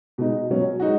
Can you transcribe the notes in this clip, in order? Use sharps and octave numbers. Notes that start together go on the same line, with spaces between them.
B2 G#3 D#4
B2 F#3 C#4
G#3 D#4 F#4